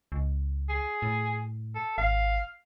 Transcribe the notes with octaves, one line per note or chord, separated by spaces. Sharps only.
C#2
G#4
A2
A4
G#1 F5